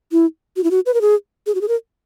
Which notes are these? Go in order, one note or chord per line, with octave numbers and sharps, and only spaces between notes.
E4
F#4
E4
F#4
B4
A#4
G#4
G#4
F#4
G#4
A#4